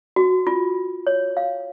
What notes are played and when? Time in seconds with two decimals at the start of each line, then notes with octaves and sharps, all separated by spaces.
0.16 F#4
0.47 F4
1.07 C#5
1.37 F5